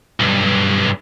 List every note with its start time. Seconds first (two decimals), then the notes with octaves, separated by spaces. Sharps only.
0.20 B1 G2